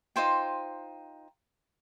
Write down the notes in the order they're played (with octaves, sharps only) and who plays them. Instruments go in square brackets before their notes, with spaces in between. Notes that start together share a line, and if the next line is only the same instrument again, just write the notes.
[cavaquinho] D#4 F4 C5 G5